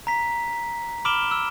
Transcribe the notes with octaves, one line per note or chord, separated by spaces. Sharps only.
A#5 B6
B5 D6 F6 D7 E7 G7
E6